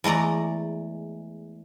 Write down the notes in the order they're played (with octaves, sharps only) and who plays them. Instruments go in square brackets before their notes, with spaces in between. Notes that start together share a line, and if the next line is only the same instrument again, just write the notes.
[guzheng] E2 G#3 A3 D5 A#5